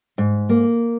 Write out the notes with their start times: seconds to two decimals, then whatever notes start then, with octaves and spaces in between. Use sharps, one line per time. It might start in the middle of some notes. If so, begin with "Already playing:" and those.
0.18 G#2
0.49 A#3